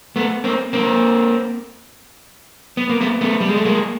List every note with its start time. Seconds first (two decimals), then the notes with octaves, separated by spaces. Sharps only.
0.16 A3 B3
0.44 A#3 C4
0.73 A#3 C4
2.77 B3
2.90 A#3
3.01 A3 B3
3.21 A3 B3
3.41 G3
3.49 G#3
3.57 A3
3.65 G#3 A#3